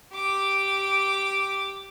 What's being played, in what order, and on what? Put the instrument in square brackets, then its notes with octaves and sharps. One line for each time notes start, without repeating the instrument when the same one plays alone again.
[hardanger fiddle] G4 D6